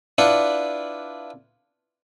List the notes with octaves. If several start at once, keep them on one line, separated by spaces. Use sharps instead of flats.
D4 E4 F4 B4 D5 F#5